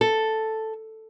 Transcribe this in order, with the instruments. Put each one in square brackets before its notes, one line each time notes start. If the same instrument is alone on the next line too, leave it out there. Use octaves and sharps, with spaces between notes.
[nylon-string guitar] A4